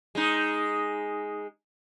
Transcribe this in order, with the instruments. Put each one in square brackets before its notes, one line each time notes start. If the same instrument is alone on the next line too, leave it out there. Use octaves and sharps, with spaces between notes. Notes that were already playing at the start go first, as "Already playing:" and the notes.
[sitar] G#3 D#4